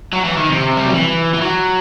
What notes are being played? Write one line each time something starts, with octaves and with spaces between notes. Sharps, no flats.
F#3
E3
D#3
C3
G3
F#3
E3
E3
F#3